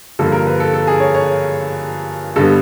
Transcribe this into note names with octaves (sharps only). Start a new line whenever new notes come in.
G2 D3 F3 A#3 A4
A#4
B4
A4
A4
G#4
C#5
C#5
G2 D3 G3 B3 A4